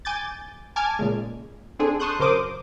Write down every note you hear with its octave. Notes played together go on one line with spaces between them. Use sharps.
G#5 D6 G6 A6
G#5 A5 D6 F6 G#6
A#2 C#3 G#3
C4 D4 G#4 A4
A5 C6 C#6 D#6 F#6 G6
F#2 C#3 A#4 C5 D6 D#6